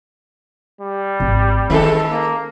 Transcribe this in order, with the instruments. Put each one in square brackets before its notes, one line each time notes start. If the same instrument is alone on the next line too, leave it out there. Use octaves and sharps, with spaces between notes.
[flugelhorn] G3
[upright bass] G#1
[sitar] D#3 G#3 A4 [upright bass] C#4
[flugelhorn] A#3